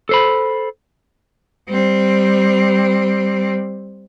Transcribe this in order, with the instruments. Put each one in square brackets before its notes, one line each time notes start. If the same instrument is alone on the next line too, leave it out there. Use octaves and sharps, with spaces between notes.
[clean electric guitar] A4 C5 B5
[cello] G3 C4